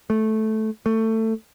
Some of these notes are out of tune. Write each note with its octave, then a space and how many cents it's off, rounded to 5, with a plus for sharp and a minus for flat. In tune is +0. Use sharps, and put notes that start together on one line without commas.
A3 -10
A3 +20